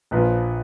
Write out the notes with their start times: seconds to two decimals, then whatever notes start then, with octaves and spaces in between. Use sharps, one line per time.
0.11 A#1 A#2 F3 B4